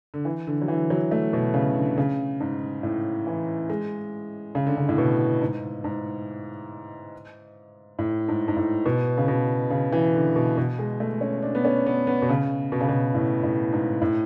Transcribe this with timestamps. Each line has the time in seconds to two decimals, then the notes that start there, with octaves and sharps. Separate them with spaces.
0.14 D3
0.25 E3
0.47 D3
0.62 F#3
0.68 E3
0.90 F#3
1.11 A3
1.33 B2
1.54 C#3
1.76 D3
1.98 C#3
2.40 G#2
2.83 A2
3.27 E3
3.70 G#3
4.55 C#3
4.67 D3
4.77 C#3
4.89 A2
4.98 B2
5.41 G#2
5.84 G#2
7.99 A2
8.28 G#2
8.48 G#2
8.57 A2
8.86 B2
9.18 C#3
9.28 B2
9.71 C#3
9.93 E3
10.14 D3
10.36 B2
10.58 B2
10.79 G#3
11.00 A3
11.21 C#4
11.43 D4
11.55 B3
11.65 C#4
11.87 B3
12.07 B3
12.22 B2
12.29 C#3
12.72 B2
12.81 C#3
12.88 B2
13.15 A2
13.44 A2
13.73 G#2
14.02 A2